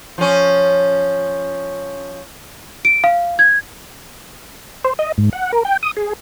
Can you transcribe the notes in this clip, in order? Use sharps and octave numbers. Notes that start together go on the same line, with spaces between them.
F3 C#4
D7
F5
G#6
C5
D#5
G#2
F#5
A#4
G5
D#6
G#4